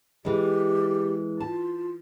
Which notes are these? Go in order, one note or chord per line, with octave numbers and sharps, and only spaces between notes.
E3 G#3 G4
F4 A5